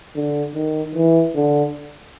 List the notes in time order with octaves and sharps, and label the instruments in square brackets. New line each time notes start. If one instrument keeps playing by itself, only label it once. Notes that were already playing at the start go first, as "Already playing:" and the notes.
[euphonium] D3
D#3
E3
D3